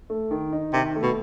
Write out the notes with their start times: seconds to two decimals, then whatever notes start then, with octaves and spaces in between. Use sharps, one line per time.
0.10 A3
0.31 D#3
0.53 D#4
0.73 C3 D#3
0.96 A3
1.02 B2